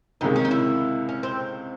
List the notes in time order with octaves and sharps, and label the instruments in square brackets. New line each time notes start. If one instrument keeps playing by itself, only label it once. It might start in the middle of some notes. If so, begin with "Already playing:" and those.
[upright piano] C#2 C3 D#3 G#3 [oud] D#4
[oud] C#4
D#4
E4
C#4
C4